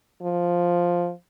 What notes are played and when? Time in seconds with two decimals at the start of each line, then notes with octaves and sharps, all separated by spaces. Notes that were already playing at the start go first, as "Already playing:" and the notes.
0.22 F3